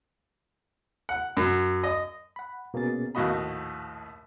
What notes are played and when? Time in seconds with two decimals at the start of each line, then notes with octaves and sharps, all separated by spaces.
1.09 F#5
1.37 F#2
1.84 D#5
2.36 F#5 B5
2.74 B2 A#3 B3 C#4 G#4 A6
3.15 A#1 D#2 A2 F#4 D#5 B5